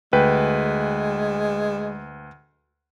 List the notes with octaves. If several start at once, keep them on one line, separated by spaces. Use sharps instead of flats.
D2 G#3 B4 G5